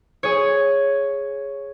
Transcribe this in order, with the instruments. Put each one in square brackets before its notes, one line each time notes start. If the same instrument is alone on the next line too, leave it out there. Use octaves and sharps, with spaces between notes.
[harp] G#4 C#5